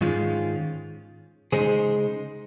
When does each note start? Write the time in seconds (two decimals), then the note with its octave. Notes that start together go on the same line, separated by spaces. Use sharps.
0.01 G#2 D#3 G#3 C#4 F4
1.52 C#3 G#3 D#4 G#4 C5